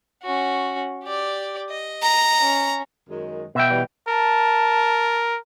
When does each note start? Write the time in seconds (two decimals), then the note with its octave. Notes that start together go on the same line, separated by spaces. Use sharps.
0.23 C#4 F#4
1.04 G4 D5
1.69 D#5
2.02 A#5
2.39 C#4
3.08 F#2 D#3 G#3
3.55 B2 E5 G5
3.68 E3 G3
4.08 A#4 A5